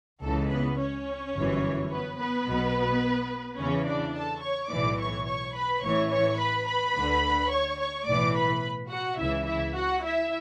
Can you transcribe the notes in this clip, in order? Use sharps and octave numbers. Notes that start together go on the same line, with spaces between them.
C#2 C#3 E3 A4
B3 B4
C#4 C#5
G1 F#2 E3
B3 B4
B3 B4
B1 B2
E2 C#3 E3 C#4 C#5
D4 D5
A4 A5
C#5 C#6
B1 A2 E3 D5 D6
C#5 C#6
C#5 C#6
B4 B5
A1 A2 E3 C#5 C#6
C#5 C#6
B4 B5
B4 B5
D2 D3
C#5 C#6
C#5 C#6
B1 A2 E3 D5 D6
B4 B5
F#4 F#5
C#2 C#3 E3 E4 E5
E4 E5
F#4 F#5
E4 E5